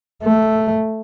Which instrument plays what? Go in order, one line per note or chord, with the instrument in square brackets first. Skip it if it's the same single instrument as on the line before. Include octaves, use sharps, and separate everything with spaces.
[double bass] A3